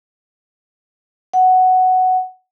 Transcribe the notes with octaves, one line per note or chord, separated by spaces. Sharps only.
F#5